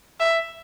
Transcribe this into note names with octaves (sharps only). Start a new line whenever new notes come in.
E5